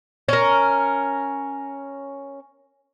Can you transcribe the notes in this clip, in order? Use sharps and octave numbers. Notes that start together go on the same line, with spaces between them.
C#4 A#4